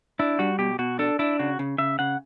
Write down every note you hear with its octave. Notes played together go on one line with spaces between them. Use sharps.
D4 E4
G3 F#4
B2 G4
B2 F#4
D4 A4
D4 E4
C#3 F#4
C#3
C#3 E5
C#3 F#5